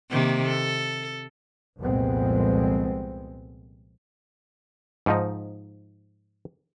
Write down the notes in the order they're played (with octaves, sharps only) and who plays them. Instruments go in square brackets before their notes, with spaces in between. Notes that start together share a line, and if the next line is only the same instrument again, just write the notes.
[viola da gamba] C3 D#3 A#3
A4
[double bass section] C2 F2 A#2 G#3 B3 C4
[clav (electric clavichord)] G#2 F3 D#4